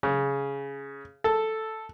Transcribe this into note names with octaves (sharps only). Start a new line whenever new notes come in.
C#3
A4